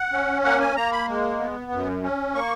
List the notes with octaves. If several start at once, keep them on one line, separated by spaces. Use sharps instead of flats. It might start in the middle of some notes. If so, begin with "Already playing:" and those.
Already playing: F#5
C#4
A#3 F#5
G#5
A#3 A#5
B5
G#3
B3
F#2
C#4
A#3 C#6